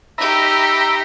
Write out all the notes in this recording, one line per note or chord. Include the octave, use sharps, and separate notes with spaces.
D#4 G4 E5 A#5 B5